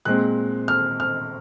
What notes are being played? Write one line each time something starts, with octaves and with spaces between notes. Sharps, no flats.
A#2 G#3 C4 F#6
F6
F6